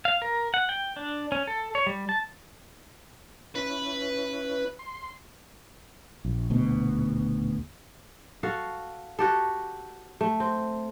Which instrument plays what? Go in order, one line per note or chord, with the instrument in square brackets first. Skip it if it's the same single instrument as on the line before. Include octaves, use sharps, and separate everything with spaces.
[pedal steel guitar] F5
A#4
F#5
G5
D4
C#4
A4
C#5
G3
A5
[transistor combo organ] C#4 E4 [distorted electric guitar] B4
[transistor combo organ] C6
[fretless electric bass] A#1
D#1 D2 B2
[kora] F#4 A4 F5
F#4 G4 A4
A3
C4